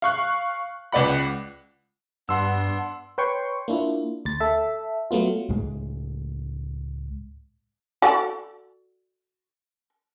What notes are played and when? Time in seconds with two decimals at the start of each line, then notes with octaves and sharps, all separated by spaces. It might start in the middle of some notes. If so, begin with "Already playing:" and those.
0.02 F5 C#6 F#6
0.92 C#2 B4 D5 F#5 B5
2.29 G2 B3 D4 F#5 C6 E6
3.18 B4 C#5 G5 C6 C#6
3.68 A#3 D4 E4 F4
4.25 D2 A6
4.40 A4 E5
5.11 F#3 A3 B3 F4
5.49 C#2 A2 G#3
8.02 F#4 A4 D5